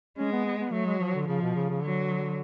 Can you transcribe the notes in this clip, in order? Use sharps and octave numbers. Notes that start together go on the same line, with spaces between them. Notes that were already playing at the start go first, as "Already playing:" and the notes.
G#3 C#4
B3
B3
B3
F#3 A3
G#3
F3
D3
C#3 F3
B2
C#3
C#3
D3 F#3